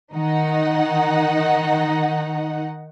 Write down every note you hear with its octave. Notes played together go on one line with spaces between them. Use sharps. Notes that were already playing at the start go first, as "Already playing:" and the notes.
D#3 D#4 F#5